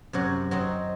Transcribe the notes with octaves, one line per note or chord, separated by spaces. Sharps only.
F#2 C3 F#3
F#3 C4 D#4